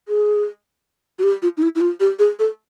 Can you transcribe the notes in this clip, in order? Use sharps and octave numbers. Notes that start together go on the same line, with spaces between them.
G#4
F#4
G4
F4
D#4
E4
E4
F4
G4
G#4
A4